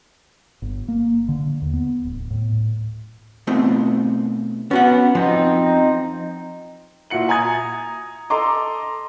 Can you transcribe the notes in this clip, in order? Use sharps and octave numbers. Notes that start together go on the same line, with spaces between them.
G1
A#3
D3
D#2
B3
D1
A2
B2 A3 C4
B3 C#4 F#4 F#5
F2 F3 C4 D#4
A#2 E4 F#4 C#7 F#7
G#5 A#5 D#6 G#6
A4 D#5 A#5 C6 D6